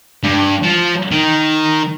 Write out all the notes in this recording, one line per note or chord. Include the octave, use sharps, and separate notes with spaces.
G2
F3
D#3